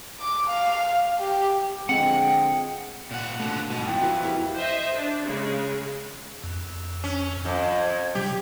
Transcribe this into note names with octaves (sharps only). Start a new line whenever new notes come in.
D6
F5
G4
D3 F3 G#3 C4 F#5 G5
A#2 F#5
B2 D3 A3
G#2 B2 G#5
F2 E4 G5
F#4 B4
E4 G4 A#4
C5 D#5 E5
D4
C#3 G#3
F2
C#4
F2
G#6
C3 F#3 G3 G4